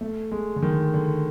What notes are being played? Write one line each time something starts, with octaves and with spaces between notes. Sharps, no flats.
A3
G#3
D3
D#3
D3